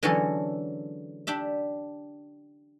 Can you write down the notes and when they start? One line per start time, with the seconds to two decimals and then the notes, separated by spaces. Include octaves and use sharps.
0.03 D3 E3 F#3 G#3 C#4 A4
1.27 D4 G4 E5